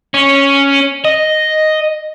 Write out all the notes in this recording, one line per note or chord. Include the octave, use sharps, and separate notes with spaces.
C#4
D#5